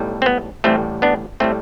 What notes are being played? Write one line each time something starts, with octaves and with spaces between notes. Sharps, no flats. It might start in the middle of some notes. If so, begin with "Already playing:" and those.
Already playing: B1 A2 G3
C4
B3
A1 A2 G3 A3 C4
B3 D4
A2 G3 A3 C4